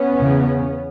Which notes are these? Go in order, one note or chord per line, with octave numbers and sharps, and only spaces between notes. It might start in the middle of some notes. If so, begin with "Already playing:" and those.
Already playing: B3 C#4
E2 C#3